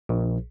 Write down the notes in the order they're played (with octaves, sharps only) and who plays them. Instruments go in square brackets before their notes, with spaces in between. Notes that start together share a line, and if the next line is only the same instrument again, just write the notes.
[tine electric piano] A#1